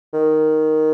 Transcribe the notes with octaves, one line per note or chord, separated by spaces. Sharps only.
D#3